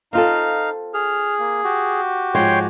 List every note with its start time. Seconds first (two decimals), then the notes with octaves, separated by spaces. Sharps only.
0.13 C4 D#4 F4 A4 F5
0.94 G#4 F6
1.40 A#3
1.64 F#4 G4
2.35 G#2 F3 G#3 C#5 G5 C6